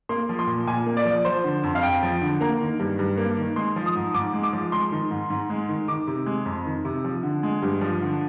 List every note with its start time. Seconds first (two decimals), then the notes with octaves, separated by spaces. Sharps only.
0.09 A#3 C6
0.29 F3
0.39 C6
0.47 A#2
0.67 A#2 G#5
0.86 A#3
0.97 D5
1.05 F3
1.25 F3 C5
1.44 D3
1.63 F2
1.75 F5
1.83 F2 G5
2.03 F3
2.22 D3
2.41 A#3 A#5
2.61 D#3
2.79 G2
2.99 G2
3.17 A#3
3.37 D#3
3.56 G#3 C6
3.76 F3
3.86 D#6
3.96 G#2
4.14 G#2 D6
4.34 G#3
4.43 D6
4.53 F3
4.72 G#3 C6
4.92 D#3
5.11 G#2
5.30 G#2
5.50 G#3
5.69 D#3
5.88 D#3 D6
6.07 C3
6.26 G#3
6.46 F2
6.66 D#3
6.85 C3
7.04 F3
7.23 D3
7.43 G#3
7.62 G2
7.81 F3
8.01 D3